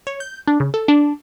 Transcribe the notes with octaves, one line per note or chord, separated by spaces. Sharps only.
C#5
G6
D4
C#3
A4
D4